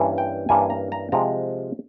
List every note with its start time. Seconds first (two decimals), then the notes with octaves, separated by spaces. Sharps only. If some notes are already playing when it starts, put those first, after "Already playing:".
Already playing: G2 E3 A#3 C#4
0.18 G5
0.49 G2 E3 A#3 C#4 G#5
0.70 A#5
0.92 A#5
1.12 C3 F3 G#3 A#5